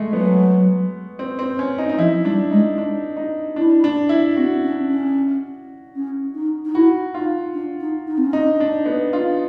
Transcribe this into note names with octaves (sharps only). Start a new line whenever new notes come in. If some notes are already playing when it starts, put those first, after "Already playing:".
Already playing: G#3 A3
F#3 B3
C4
C4
C#4
D#4
D#4
F3 E4
G3 D4
G#3 D#4
D4
D#4
D4 E4
D4
E4
C4 F#4
C#4
C#4
C#4
D#4
D#4
E4 F#4
D#4 F4
D4
D#4
D#4
C4
C#4
D4 D#4
D4
B3
D4 F4